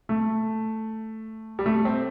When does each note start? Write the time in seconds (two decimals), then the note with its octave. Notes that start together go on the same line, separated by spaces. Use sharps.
0.09 A3
1.59 G3
1.66 A3
1.85 C4